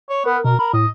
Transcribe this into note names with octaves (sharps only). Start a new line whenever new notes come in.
C#5
B3 A#4
B2 A#4
A#4 B5
A2 D#5